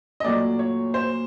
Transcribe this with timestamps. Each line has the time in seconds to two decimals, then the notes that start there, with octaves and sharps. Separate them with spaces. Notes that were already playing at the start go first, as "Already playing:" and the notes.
0.20 D#5
0.25 A#2 F#3 A3 D5
0.59 C#5
0.94 C5